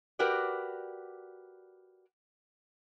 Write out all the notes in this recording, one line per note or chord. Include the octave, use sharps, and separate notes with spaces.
F#4 G4 A#4 B4 D5